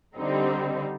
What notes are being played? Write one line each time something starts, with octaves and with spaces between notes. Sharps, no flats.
D3 G3 C4 D#4